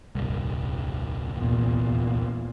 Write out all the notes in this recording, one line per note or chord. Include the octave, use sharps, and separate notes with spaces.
D#1 C2 G2
E2 A#2